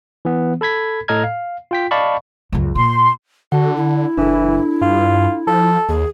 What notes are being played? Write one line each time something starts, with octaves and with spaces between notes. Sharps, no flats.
E3 B3
A4 B5 G#6 B6
A2 A4 D#5 A#5 F6 G#6
F5
F4 G5 B6
D5 D#5 F5 A5 B5 C#6
C#2 F#2
A#2 C6
D3 F#4 F#5 A5
E4
F#1 E3 D4 A4
G2 F4
F3 A4
D#2 G#4